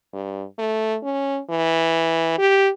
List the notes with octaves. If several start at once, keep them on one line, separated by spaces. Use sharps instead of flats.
G2
A3
C#4
E3
G4